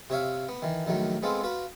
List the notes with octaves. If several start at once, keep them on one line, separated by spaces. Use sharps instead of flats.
C3 C#5 E5 F5
B3
D#3 E3
A#1 D#3 F#3 A3
G#3 B3 C4 F4 A4
F4 F#4 B4